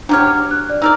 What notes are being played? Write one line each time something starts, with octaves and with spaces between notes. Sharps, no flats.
F#3 D4 G4 C#5 F6
F#6
D5
D#4 A#4 D5 E6 F6